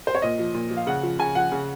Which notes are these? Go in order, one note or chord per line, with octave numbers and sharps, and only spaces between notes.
C5
C#5
A#2 D#5
F3
A#2
F3
F5
C#3 F#5
F3
C#3 G#5
F3 F#5
C#3